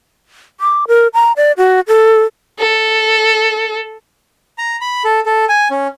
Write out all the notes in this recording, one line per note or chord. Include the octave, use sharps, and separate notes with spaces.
D6
A#4
A#5
D5
F#4
A4
A4
A#5
B5
A4
A4
G#5
C#4